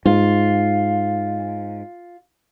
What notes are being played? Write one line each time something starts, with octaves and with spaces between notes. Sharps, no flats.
G#2 F4